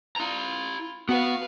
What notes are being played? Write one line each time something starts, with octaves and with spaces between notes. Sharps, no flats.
E4 F4 A#5
B3 F#4 B4 F5 F#5